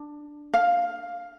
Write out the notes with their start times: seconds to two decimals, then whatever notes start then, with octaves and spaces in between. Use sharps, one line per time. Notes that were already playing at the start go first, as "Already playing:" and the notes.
Already playing: D4
0.54 F5